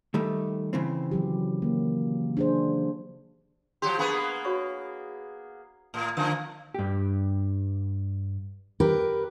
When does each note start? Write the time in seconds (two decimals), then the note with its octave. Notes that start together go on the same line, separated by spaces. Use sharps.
0.14 D#3 G3 A3
0.73 C#3 E3 C4
1.11 D#3 F#3 G4
1.62 A#3
2.37 D4 G#4 C5
3.82 F3 F#3 G4 C6
3.98 A#3 B3 D4 G#4 B5 C#6
4.45 F#4 C#5 C#6
5.94 A2 A#3
6.17 D3 F3 A#3 D4 E6
6.75 G2 G4
8.80 G4 A#4 B4